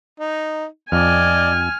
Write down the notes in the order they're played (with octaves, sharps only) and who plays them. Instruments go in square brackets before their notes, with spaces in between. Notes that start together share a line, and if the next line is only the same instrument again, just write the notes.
[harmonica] D#4
[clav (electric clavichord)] F2 [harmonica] D5 D#5 [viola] G#5 [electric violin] F6